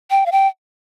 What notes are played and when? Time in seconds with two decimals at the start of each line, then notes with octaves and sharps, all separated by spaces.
0.11 G5
0.26 F5
0.32 G5